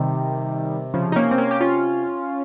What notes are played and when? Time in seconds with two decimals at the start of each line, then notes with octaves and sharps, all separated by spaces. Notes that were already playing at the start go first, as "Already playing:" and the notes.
Already playing: C3 D#3 G3
0.94 C#3 F3
1.12 D#4
1.16 A#3 C#4
1.31 C4
1.38 A#3 C#4
1.51 G4
1.61 C#4 F4